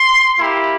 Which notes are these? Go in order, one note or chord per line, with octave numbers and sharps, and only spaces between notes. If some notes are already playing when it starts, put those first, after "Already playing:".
Already playing: C6
A#3 E4 G4